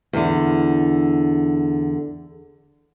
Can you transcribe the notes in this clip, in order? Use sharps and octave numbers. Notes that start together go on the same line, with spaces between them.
E2 D3